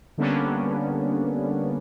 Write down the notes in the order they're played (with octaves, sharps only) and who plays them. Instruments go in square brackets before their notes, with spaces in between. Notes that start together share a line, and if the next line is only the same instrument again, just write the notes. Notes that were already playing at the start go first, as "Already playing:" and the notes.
[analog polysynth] D3 G3 A#3 B3 C#4 D4